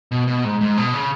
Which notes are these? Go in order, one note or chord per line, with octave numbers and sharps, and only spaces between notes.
B2
B2
G#2
G#2
B2
C#3